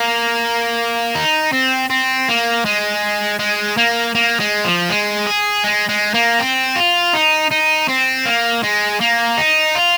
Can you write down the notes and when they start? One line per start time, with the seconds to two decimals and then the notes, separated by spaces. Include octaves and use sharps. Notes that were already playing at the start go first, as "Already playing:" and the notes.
Already playing: A#3
1.15 D#4
1.53 C4
1.90 C4
2.28 A#3
2.65 G#3
3.39 G#3
3.77 A#3
4.15 A#3
4.40 G#3
4.65 F3
4.89 G#3
5.27 G#4
5.64 G#3
5.89 G#3
6.14 A#3
6.39 C4
6.76 F4
7.13 D#4
7.51 D#4
7.88 C4
8.25 A#3
8.63 G#3
9.00 A#3
9.38 D#4
9.75 F4